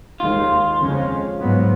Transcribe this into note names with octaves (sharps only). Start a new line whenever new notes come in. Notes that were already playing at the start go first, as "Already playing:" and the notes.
D#2 D#3 G#3 F4
F2 C#3 F3 G#3 C#4
G#2 F#3 B3